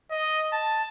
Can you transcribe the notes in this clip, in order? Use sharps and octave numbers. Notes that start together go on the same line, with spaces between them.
D#5
A5